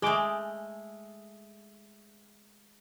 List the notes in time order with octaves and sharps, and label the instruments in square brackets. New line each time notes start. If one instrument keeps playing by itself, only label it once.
[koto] G#3 A3 [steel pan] G#4 D6